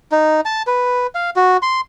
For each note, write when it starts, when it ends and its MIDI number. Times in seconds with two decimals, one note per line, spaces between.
0.12 0.41 63
0.45 0.62 81
0.67 1.07 71
1.15 1.30 77
1.36 1.57 66
1.62 1.81 84